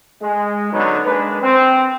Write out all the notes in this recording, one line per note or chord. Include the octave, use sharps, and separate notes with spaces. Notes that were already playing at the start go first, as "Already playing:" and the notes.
G#3
D3 F#3 B3 C#4 D#4
G#3 A#3 D4 B4
C4